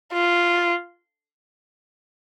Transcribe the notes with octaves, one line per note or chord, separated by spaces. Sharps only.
F4